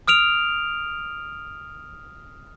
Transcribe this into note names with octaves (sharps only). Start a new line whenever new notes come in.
D#6 F6 D7 F7